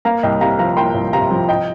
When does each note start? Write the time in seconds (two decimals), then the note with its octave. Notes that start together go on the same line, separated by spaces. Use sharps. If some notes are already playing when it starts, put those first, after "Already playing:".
0.05 A#3 F5 A#5
0.23 C2 D#5 G5
0.41 C3 F5 A#5
0.59 F3 F5 A#5
0.77 A#3 G5 C6
0.94 C2
1.13 C3 F5 A#5
1.31 F3
1.48 D#5 G5